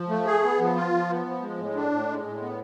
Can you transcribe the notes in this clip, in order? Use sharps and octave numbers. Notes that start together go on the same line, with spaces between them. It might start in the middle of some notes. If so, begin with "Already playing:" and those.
Already playing: F3
A3
G#4
B3
F3
F4
F3
B3
F3
G#3
A2
D4
A2
G#3
A2
B3